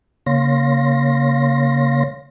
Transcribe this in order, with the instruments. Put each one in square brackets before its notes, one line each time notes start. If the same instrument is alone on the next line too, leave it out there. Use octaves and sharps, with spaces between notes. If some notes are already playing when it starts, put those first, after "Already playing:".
[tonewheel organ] C#3 A#3 C#5 F5 C6 A#6